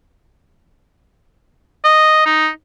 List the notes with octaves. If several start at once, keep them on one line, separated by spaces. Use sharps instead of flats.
D#5
D#4